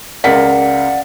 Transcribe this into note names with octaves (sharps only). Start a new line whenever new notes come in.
C#2 A#4 D5 F5 F#5 B6